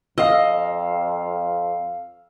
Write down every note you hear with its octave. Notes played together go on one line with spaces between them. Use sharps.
F2 D#5 F5 E6